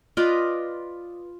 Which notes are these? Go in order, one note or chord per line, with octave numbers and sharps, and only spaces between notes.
F4 B4 D5 D#5